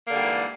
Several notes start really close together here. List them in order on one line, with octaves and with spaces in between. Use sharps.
A#3 D3 G3 G#2 E3